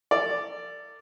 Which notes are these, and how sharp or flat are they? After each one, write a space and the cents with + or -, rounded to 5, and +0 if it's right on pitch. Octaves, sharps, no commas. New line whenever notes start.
A4 +45 D5 +0